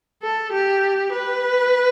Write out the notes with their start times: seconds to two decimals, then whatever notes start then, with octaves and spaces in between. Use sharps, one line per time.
0.22 A4
0.52 G4
1.12 B4